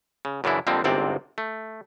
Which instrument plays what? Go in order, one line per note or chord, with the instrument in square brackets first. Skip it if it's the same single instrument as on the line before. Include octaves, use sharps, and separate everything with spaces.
[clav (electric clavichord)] C#3
F#2 C#3 E3 D4 E4
F2 D3 F3 G3 A#3 C4
G1 C2 G#2 C3 C4 D5
A3